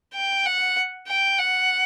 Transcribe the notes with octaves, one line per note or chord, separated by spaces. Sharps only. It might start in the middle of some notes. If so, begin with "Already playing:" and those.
G5
F#5
G5
F#5